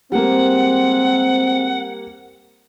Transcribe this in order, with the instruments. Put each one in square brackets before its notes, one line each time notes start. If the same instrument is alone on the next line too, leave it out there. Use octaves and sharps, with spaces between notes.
[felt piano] G3 A#3 [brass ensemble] G#3 C4 [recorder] F#5